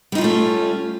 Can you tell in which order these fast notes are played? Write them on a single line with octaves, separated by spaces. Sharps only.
G3 D#4 F4 C#4 A3